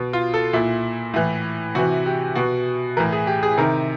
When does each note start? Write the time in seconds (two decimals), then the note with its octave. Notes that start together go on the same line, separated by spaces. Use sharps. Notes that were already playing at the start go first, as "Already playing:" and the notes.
Already playing: B2
0.13 F4
0.34 A4
0.53 A#2 E4
1.14 A2 E3
1.75 C3 E3 F#4
2.06 G4
2.35 B2 F#4
2.97 A2 E3 A#4
3.12 G#4
3.27 G4
3.43 G#4
3.58 C3 D#3 A#4